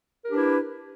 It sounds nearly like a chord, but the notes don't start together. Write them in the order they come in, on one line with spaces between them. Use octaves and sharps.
A#4 G4 D4 B4 E4